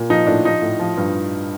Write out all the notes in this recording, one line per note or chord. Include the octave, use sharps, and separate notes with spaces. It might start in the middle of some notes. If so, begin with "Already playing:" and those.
Already playing: A#2
F3 D#4
A2 D4
F3 D#4
A2
F3
G2